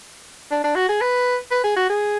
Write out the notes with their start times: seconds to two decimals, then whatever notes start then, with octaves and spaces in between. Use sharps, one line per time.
0.51 D4
0.64 D4
0.75 F#4
0.89 G#4
1.01 B4
1.51 B4
1.64 G#4
1.76 F#4
1.90 G#4